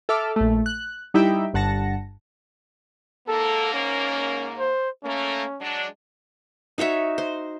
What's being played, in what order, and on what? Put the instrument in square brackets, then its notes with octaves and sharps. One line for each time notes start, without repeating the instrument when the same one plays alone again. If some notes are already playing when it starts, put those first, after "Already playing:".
[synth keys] A4 E5 D6 F6
A#1 A3
F#6
G3 D#4 E4 G4 E5 G5
G1 G2 F#5 A5 A#6 C#7
[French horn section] G#2 A#3 [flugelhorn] A4
[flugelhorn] C#4
C5
[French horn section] A3 A#3 [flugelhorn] C#4
[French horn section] F#3 G#3 D4
[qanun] D#4 F#4 C#5 E5
C5